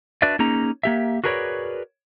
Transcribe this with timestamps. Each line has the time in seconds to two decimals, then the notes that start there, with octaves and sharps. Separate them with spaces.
0.22 D4 F#4 B4 D5 E5
0.39 A#3 C#4 D#4 G#4 A#5
0.83 A#3 G4 E5
1.24 F#4 G#4 A#4 B4 C#5 D5